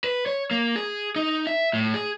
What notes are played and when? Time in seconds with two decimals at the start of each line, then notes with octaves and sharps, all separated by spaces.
0.04 B4
0.26 C#5
0.51 A#3
0.76 G#4
1.16 D#4
1.47 E5
1.73 A2
1.94 G#4